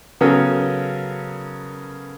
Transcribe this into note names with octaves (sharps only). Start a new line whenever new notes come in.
C#3 F#3 B3 C#4 A4 A#4